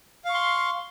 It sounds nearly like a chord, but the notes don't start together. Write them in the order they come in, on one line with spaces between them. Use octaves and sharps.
F5 C#6 C6